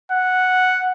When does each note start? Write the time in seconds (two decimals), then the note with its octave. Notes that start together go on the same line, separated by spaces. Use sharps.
0.12 F#5